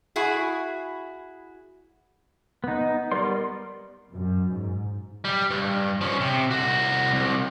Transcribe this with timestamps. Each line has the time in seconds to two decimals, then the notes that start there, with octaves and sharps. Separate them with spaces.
0.16 E4 F#4 G#4
2.64 B3 D#4
3.12 G3 B3 A#4 D5 C6
4.10 F#2
4.52 G#2
5.25 G3
5.50 G2
6.01 F3 C#4
6.20 C3
6.51 C2 F#4
7.13 C2